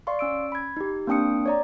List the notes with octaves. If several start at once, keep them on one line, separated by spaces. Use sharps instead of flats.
D5 F5 C6 C#6
C#4 E6 D7
B5 G#6
D#4 G4
A#3 C4 D4 G5 D#6 C#7
C#5 D5 A#5